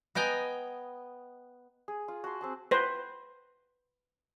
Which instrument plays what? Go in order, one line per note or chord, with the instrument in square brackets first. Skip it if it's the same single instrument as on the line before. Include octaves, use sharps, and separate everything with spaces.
[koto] B3 D#5 G5 G#5 A#5
[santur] G#4
F4
F#4 A5 C6
C4 G#4 A5
[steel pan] B4 C5